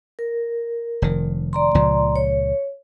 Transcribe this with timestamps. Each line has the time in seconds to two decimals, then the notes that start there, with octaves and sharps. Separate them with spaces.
0.19 A#4
1.02 F1 D#3
1.53 D5 A#5 C6
1.75 C#2 A#2 F3
2.16 C#5